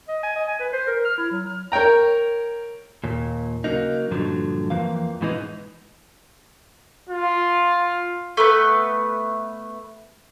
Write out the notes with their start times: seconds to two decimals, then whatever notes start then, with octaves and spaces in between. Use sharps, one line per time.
0.08 D#5
0.23 G#5
0.36 D#5
0.48 G#5
0.60 B4
0.73 C5
0.87 A#4
1.05 F6
1.18 E4
1.31 F#3
1.47 F6
1.72 A#4 C#5 G5 A#5
3.04 D#2 A#2
3.64 C#3 F#3 A#3 D#4
4.11 G2 A#2 D3 F3 F#3
4.70 F2 E3 F3 A#3 F5
5.21 G#2 B2 E3 G#3 B3 D#4
7.09 F4
8.37 A3 B3 B4 B5